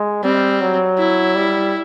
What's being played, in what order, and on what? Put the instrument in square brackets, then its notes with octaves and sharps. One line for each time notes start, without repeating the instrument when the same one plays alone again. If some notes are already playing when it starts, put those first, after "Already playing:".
Already playing: [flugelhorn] G#3
[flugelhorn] G3 [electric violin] C4
[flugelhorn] F#3
[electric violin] E4
[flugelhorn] G3